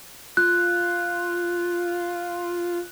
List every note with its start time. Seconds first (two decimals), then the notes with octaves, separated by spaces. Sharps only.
0.37 F4 F#6